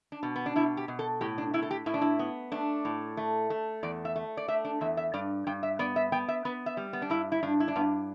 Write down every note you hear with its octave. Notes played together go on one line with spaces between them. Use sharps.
D4
B2
B3
D4
B2 E4
G4
B2
A4
A2 G4
D4
A2 E4
A4
G4
A2 E4
D4
E4
B3
A3 D4
A2
A3
A3
E2 D5
E5
A3
D5
A3 E5
D4
E2 E5
E5
G2 D5
G2 G5
E5
B3 D5
E5
B3 G5
E5
B3 B4
E5
G3
B3
D4
G2 E4
E4
G2 D4
E4
D4
G2 B3